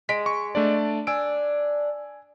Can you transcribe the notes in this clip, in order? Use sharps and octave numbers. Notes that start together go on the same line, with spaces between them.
G#3 B6 D7
C#6
A3 D4 D5
D4 G#5 E6 D7